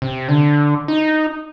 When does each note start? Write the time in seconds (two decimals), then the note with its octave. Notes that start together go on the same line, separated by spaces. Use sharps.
0.02 C3
0.28 D3
0.88 D#4